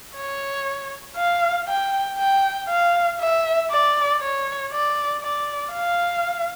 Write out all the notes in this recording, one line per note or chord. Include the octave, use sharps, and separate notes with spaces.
C#5
F5
G5
G5
F5
E5
D5
C#5
D5
D5
F5